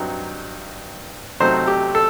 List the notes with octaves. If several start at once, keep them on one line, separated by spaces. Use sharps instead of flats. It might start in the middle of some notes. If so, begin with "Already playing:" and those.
Already playing: G2 F#3 C4 D#4
C3 F#3 A3 C4 D#4 C5
G4
A4